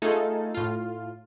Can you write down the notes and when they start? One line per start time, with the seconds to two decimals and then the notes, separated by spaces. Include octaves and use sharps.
0.02 A3 D#4 F4 G#4 A4
0.54 A2 F4